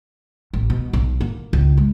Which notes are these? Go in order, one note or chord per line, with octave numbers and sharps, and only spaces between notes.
A1
B2
B1
A#3
C#2
G#3